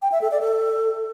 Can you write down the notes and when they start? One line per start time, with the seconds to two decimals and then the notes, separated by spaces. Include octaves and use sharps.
0.02 G5
0.12 E5
0.22 A4
0.31 D5
0.41 A4